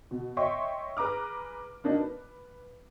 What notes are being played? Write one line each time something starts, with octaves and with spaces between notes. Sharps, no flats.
B2
C#5 D#5 E5 G5 C6 C#6
G#4 B4 A#5 D6 F6
A#3 D4 D#4 F#4
B4